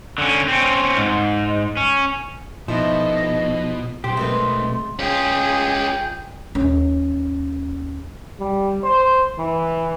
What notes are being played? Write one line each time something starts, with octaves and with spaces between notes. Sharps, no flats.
D3 C#4
C4 C#4
G#2
C#4
B2 F3 D#4 E4 A4 D#5
B1 G4 C5 C6
G#3 A3 C4 A#4 B4
C#4 F4 G#4 G5 G6
D#2 C#4
G3
C5
E3